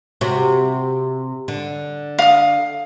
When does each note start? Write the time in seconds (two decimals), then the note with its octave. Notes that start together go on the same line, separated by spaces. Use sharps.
0.21 C3 F#4
1.48 D3
2.19 F5 D#6